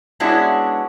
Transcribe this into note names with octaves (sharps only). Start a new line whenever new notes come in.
G#3 B3 C#4 D4 E4 F#4